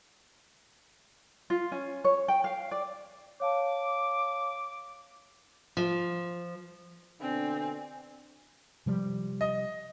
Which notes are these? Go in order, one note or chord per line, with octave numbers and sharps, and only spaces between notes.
F4
C#4
C#5
G5
F5
D5
C#5 F5 A5 D6
F3
B2 D3 C4 D4 G#5
C3 F3 G3
D#5